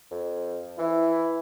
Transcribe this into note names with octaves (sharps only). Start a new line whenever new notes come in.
F2
E3 E4